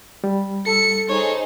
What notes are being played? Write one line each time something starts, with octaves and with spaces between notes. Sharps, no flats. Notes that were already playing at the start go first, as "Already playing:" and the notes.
G3
A4 C#7
D#4 G#4 C5 C#5